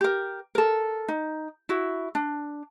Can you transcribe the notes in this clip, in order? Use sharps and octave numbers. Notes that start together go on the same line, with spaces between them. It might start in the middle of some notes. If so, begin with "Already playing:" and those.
G4 A#4
A4 A#4
D#4
E4 F#4
D4